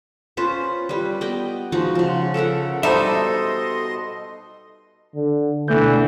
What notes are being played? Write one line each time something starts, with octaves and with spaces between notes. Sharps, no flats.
C#4 F4 B4 C5
G3 B4
B3 D5 D#5 G5
F3 G#3 D#4 F#4
C#3 F3
A4 A#4 E5 F#5
B2 G3 D#4 A4 C5 D#5 E5 C6
D3
B2 D3 E3 A3 G6